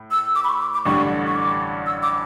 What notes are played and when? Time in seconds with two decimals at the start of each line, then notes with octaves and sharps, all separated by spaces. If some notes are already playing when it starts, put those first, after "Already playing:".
Already playing: A2
0.11 E6
0.35 D6
0.44 B5
0.49 C#6
0.61 D6
0.73 D6
0.85 A1 G2 D3 G3 C#6
1.27 C#6
1.35 D6
1.86 E6
2.03 D6